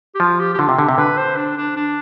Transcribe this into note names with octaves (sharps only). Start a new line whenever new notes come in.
G4
F3 F4
G4
G4
D3 F4
C3
D3 G4
C3
D3 B4
C5
D4
D4
D4